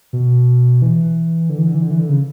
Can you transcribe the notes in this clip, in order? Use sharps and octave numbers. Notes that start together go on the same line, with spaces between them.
B2
E3
D3
E3
D3
E3
D3
E3
D3
C#3